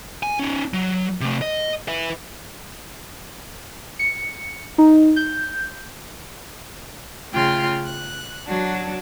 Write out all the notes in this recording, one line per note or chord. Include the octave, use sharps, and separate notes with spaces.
G#5
C#4 D#4
F#3
C3 A3
D#5
B4 E5
C#7
D#4
G6
C#3 A3 F4 G5 C6
F#6
F#3 D4 F#4